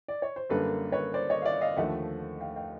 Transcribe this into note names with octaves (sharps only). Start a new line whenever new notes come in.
D5
C#5
C5
F#2 D3 G3 A#3 A4 B4
B4 C#5
C5 D5
C#5 D#5
F5
D5 E5
D#5 F5
D#2 D3 F3 A3 E5 F#5
F5 G5
F5 G5